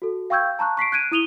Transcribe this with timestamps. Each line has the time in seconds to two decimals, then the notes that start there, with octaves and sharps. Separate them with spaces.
0.02 F#4 A4
0.30 F5 G5 C#6 E6 G6 G#6
0.59 A5 A#5 C#6 F#6
0.77 C#6 B6 C7 D7
0.92 F#6 G#6 D7 D#7
1.12 E4 D#6 D#7 F7 G7